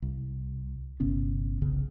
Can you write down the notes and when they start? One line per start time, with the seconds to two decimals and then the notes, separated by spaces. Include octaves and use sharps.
0.02 C2
1.00 G1 C3 B3 C#4
1.62 F1 B1 C#3